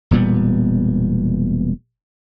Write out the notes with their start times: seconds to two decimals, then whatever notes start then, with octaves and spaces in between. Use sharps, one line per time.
0.11 E1 A#2 G3 B3